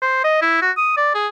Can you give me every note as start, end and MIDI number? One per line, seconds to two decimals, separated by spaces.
0.02 0.23 72
0.24 0.40 75
0.42 0.58 64
0.62 0.72 66
0.77 0.96 87
0.97 1.10 74
1.15 1.28 68